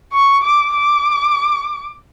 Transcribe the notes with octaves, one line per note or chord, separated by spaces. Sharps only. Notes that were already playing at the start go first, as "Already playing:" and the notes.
C#6
D6
D6